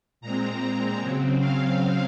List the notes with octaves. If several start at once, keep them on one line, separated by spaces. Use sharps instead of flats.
A#2 G#3 C4 A#5
C#3 F#3 C4
F5